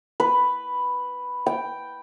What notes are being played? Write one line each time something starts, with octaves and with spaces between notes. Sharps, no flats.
B4
G5